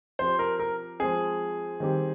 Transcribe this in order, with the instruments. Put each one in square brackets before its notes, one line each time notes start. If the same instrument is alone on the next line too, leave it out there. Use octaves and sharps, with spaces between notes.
[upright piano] F3 C4 G4 [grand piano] C5
[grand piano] A#4
A#4
[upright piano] F3 G#3 C4 [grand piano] G#4
[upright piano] D#3 G3 C4 G4